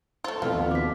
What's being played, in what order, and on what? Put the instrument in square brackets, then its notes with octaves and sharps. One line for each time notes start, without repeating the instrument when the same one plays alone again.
[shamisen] A3 F4 [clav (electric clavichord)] C5
[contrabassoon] F2 [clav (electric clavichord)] B2 A3 E4 [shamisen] F3 [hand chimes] F5 F6
[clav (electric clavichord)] D#2 B3
[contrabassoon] B2 [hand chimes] D6 B6